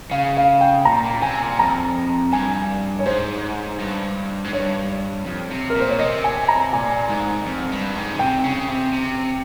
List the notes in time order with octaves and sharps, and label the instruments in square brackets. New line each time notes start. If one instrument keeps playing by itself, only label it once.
[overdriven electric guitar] C#3 [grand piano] F5
[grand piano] F5
G5
[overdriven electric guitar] A#2 [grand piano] A#5
[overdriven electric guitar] A#2
[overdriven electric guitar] C3 [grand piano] G#5
[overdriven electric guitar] A#2
[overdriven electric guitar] F2 [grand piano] A#5
[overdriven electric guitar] G2 [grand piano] G#5
[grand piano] C#5
[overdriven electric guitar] G#2 [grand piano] C5
[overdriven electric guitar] G2
G#2
[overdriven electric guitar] G2 [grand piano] C#5
[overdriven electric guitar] F2
C3
[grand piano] A#4
[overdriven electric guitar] A#2 [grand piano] C5
[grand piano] C#5
[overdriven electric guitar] C3 [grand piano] D#5
[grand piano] G#5
A#5
[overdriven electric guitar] A#2 [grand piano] G#5
[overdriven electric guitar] G#2
F2
G2
G#2
C#3
[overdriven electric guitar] C3 [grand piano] G5
[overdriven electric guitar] C#3
C3
C3